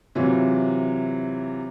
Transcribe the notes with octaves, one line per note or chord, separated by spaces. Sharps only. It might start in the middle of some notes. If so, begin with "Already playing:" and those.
C3 E3 F#3 F4